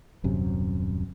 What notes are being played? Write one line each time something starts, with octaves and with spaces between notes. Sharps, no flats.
D#1 F#2 C3